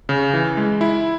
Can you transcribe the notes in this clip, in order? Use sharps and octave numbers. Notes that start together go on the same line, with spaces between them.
C#3
E3
G#3
E4